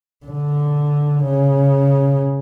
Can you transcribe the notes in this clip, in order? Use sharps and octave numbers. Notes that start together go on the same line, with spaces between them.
D3
C#3